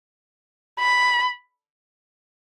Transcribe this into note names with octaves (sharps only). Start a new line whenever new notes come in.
B5